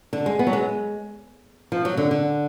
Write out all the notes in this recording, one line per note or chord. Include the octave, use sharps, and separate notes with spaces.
D3
G#3
B3
F#3
G#3
F3
F#3
D3
D3